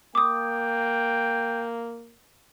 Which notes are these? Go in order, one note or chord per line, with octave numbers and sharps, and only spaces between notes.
A#3 G5 D6 D#6